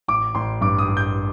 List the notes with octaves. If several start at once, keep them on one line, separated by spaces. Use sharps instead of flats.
A1 D6
A1 C6
G2 D6
D#6
A1
G6